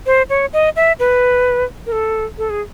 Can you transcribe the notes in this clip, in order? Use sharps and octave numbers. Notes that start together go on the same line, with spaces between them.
C5
C#5
D#5
E5
B4
A#4
A4
A4
G#4